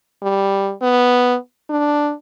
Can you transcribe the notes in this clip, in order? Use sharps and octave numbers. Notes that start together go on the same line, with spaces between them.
G3
B3
D4